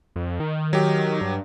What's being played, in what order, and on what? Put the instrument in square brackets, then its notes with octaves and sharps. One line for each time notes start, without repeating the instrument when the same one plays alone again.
[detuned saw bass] F2
D#3
D#3
[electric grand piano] F#3 G4
[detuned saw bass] G2